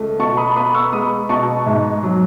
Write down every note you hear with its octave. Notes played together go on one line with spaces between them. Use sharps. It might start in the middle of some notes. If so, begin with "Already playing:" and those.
Already playing: C#2 A3
B2 A5 C#6
B5 D#6
B3 B5 D#6
C#6 E6
G#3 B5 D#6
B2 A5 C#6
G#2
F#3